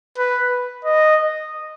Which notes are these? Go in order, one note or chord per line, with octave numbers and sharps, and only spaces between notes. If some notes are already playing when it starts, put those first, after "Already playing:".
B4
D#5